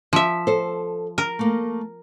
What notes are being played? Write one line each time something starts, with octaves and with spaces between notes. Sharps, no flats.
F3 E5
A4 C5
A#4
A3 A#3